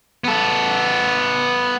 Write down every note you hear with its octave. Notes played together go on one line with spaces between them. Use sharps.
B3 A4